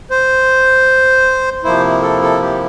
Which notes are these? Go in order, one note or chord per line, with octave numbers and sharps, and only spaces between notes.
C5
C3 F3 A#3 E4 C5
A4
A4
G4